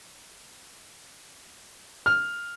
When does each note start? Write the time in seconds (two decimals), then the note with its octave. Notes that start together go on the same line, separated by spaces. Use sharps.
2.06 F6